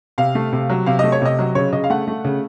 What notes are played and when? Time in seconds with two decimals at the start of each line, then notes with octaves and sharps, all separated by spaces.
0.18 C3 F5
0.35 A3
0.52 C3
0.70 F#3
0.86 C3 F5
0.99 A3 D#5
1.12 C#5
1.22 C3 D#5
1.39 F#3
1.55 C#3 C#5
1.73 C#3 D#5
1.84 F5
1.90 A3 F#5
2.08 A3
2.24 C#3